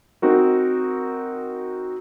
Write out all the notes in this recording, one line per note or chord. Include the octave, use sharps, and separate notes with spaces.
C4 D#4 F#4 A#4